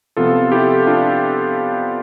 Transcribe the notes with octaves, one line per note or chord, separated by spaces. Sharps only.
C3 F3 B3 F4 A4
E4 G4
D4 F4